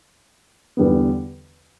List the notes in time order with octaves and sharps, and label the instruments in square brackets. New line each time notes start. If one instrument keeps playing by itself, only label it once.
[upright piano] E2 D3 G3 B3